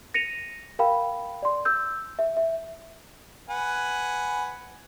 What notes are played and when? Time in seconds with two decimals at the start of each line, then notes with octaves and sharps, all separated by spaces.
0.14 A#6 C#7 D#7 F7
0.79 A#4 F5 G5 B5
1.43 D5 C6
1.65 E6 G6
2.19 E5
2.37 E5
3.49 B4 F#5 G#5